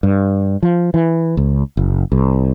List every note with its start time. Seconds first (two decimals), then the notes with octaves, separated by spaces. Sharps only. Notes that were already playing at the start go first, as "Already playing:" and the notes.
0.03 G2
0.63 F3
0.94 E3
1.37 C#2
1.77 F#1
2.12 C2